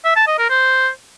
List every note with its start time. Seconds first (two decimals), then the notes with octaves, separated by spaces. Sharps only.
0.05 E5
0.16 A5
0.27 D#5
0.39 A#4
0.50 C5